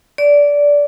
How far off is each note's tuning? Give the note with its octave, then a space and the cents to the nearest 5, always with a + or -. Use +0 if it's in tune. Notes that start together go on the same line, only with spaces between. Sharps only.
D5 -15